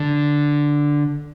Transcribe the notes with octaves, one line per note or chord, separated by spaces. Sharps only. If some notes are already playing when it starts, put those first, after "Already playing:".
Already playing: D3